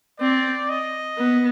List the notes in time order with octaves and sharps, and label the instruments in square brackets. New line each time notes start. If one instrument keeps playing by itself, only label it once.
[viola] C4 [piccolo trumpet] D5
[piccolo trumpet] D#5
[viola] B3